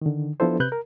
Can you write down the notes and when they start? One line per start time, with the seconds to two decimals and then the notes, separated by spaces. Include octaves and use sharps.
0.02 D3 D#3
0.40 F3 B3 D4 E4 A4 C5
0.60 C3 B4 F#6 G6
0.72 A#4